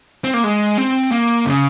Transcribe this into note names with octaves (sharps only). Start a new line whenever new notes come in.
C4
A#3
G#3
C4
A#3
C#3